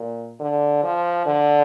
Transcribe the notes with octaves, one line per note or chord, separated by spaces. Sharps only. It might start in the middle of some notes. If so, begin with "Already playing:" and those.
Already playing: A#2
D3
F3
D3